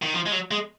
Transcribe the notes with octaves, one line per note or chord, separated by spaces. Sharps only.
D#3
F3
G#3
F#3
G#3